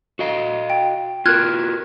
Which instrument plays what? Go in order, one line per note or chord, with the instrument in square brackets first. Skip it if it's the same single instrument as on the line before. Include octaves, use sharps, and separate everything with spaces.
[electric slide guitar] F#4 D#5 F5
[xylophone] G5
[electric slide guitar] F4 F#4 A#4 [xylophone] F6 F#6 G#6